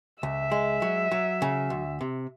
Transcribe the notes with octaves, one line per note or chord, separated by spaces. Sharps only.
C#2 E5
G#3
F#3
F#3
C#3
D2
C3